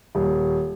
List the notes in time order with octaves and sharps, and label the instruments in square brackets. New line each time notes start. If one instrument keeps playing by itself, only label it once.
[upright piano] D#1